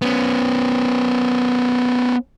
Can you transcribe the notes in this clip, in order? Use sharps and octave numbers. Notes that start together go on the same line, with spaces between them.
B3 C#4